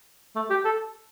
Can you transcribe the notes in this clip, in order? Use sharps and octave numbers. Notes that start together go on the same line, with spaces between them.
A3
G4
A4